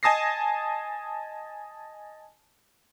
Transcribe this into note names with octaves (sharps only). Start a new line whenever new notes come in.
D#5 G#5 A5 D#6 A#6 C7